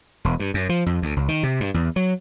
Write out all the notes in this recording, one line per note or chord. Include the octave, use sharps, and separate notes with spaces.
E1
G2
F#2
F3
F2
D2
C#2
D#3
C3
G2
E2
F#3